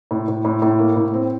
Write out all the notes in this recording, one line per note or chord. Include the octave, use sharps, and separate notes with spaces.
A2
A2
A2
A2
A#3
A2
C4